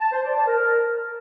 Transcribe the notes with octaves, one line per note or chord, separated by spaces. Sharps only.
A5
C5
D5
A5
A#4